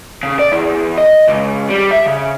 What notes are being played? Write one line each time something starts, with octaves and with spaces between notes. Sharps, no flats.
C#3
D5
E2
D#5
C#2
G3
E5
C#3